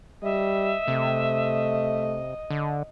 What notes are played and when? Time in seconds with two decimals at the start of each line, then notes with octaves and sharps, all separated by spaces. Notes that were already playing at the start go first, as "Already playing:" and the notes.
0.23 G3 D#5 E5
0.88 C3 A3
2.50 D3